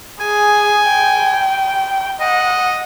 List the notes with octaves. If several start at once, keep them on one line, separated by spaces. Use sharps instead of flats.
G#4 G#5
G5
D#5 F#5